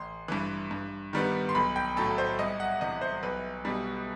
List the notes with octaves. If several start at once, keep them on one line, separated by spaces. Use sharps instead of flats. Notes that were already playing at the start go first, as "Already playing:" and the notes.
Already playing: A1 C6
G2 E3
G2
D#3 G3 B3
C6
B1 B5
G5
A2 F#3 A3 A4
C5
C2 D#5
F#5
C3 E3 D#5
C5
B1 B4
B2 G3